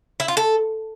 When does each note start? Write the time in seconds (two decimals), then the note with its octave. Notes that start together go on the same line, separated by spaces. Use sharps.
0.20 E4
0.28 F4
0.37 A4